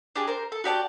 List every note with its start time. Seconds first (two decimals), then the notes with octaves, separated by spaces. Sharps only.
0.16 D4 G4 G#4
0.27 A#4 C5
0.52 A4
0.64 F#4 G4 D5 A5